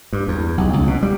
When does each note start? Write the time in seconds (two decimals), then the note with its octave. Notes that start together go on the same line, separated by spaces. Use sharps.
0.13 G2
0.28 E2
0.58 B1
0.73 C#2
0.88 B2
1.03 G3